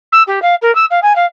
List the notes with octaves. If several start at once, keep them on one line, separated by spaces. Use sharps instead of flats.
E6
G4
F5
A#4
E6
F5
G#5
F5